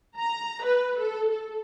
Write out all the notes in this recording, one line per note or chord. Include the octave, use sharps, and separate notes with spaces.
A#5
B4
A4
A4